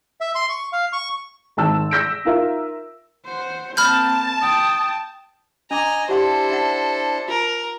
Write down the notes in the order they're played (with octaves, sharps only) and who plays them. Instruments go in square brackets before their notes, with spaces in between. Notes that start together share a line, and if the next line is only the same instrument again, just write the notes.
[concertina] E5
C6
C#6
F5
C#6
[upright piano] G#1 D#3 A5 E6
E6 G6 A#6 B6 D7
D#4 F4 A#4 E5
[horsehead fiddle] C5 F#5
[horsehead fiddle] A#3 C4 [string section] A5 [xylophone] B5 F6 G6
[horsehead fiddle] G5 [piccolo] D#6
[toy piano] D4 D6 [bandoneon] D#5 G#5 [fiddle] A#5
[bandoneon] D4 E4 [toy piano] G4 F#5 C6 [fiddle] A4 C5
[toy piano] D#4 E5 F#5
[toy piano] F4 A5 [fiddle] A#4